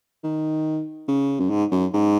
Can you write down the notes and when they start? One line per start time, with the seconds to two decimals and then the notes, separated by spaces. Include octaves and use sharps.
0.23 D#3
1.08 C#3
1.40 F#2
1.50 G#2
1.71 F#2
1.93 G#2